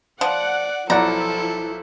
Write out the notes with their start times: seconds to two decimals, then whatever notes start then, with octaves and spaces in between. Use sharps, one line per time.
0.21 F3 D5 F#5
0.90 B1 F3 E4 A4 D5 F#5 A#5